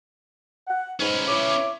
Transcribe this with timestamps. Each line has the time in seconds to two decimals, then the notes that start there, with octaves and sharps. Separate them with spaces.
0.68 F#5
1.00 G#2 C#4 B4
1.28 E4 C#5 D6